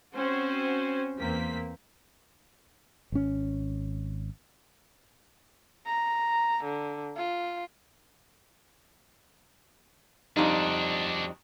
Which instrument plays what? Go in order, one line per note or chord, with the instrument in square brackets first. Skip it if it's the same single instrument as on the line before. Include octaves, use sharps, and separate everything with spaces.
[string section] C4 C#4 F#4 C5
E2 A#3 C4 B6
[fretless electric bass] G#1 C#4
[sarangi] A#5
D3
F4
[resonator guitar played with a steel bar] F2 G3 D#4 [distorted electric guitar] D4 F#4